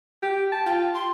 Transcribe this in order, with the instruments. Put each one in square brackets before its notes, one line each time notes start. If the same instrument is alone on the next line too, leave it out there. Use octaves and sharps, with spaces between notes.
[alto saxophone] G4
A5
[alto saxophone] F4 [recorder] G5
[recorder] C6